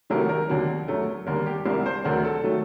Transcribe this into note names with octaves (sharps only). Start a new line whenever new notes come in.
C2 C3 D#3 F#3 A3 A#4
A#4
D#2 D3 F#3
F#2 F#3 A3
D#2 D3 G3 A#4
G4
C2 C3 G3 A#4
C5
D2 D3 F#3 A3 A#4
A4
D#3 F#3 A3